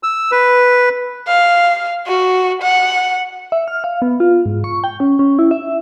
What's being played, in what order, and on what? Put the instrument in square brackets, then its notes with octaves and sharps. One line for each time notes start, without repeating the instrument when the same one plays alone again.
[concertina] E6
B4
[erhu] F5
F#4
F#5
[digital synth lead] E5
F6
F5
B3
F4
G#2
C#6
G5
C#4
C#4
E4
E5